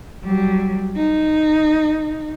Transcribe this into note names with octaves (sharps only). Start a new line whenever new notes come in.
F#3 G3
D#4